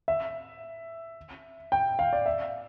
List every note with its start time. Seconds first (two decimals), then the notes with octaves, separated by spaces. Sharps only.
0.08 E5
1.72 G5
1.99 F5
2.13 D5
2.26 E5